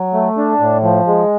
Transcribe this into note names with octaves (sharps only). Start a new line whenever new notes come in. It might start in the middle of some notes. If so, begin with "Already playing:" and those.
Already playing: F#3
A3
D4
A2
F3
G#3